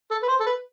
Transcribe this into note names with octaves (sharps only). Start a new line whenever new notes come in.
A4
B4
C5
A4
B4